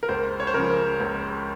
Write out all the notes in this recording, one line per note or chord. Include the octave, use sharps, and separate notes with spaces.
A#4
C#2 C5
C#5
C5
C#3 F3 A#4
C#2